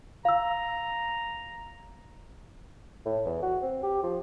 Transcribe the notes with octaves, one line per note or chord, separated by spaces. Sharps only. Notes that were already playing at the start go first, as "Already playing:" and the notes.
F5 A#5 E6
A2
E2
F#4
C4
G4
F3